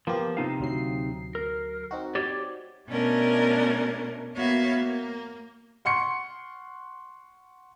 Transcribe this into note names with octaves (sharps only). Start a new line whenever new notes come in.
F3 A#3 B3 G4
C3 D#4 F5
D2 F#3 C7
A#4
C4 D#4 F#4
G4 C#5 D5
B2 A3 C#4 D4 A#4
A#3 B3 F#4 C#5 E5 F5
A#3
F#5 C6 C#6 C#7